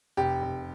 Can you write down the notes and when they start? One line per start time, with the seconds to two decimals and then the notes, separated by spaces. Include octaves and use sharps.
0.17 F1 G4
0.42 F1